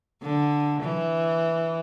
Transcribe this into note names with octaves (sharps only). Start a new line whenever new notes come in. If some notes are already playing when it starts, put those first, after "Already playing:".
D3
E3